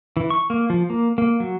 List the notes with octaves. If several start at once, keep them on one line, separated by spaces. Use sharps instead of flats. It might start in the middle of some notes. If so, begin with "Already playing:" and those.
E3
C#6
A#3
F3
A#3
A#3
F#3